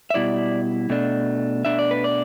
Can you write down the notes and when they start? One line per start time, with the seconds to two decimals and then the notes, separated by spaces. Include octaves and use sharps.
0.10 E5
0.14 B2 G3 E4 D5
0.90 B2 A3 D4
1.65 B2 A3 D4 E5
1.79 D5
1.91 B4
2.04 D5